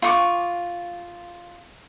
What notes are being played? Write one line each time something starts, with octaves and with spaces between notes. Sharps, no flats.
F4 C#6 D6